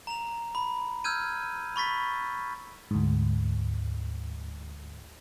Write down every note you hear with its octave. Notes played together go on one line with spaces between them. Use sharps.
A#5 F7
B5
E6 F6 G6 G#6 D#7
B5 C#6 A6 B6
D2 G#2